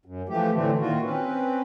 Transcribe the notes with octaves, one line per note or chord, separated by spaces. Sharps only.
F#2
E3 F3 A3 G4
A2 D3 E3 A3 C4
A#2 D#3 F4 F#4
C4 C#4 B4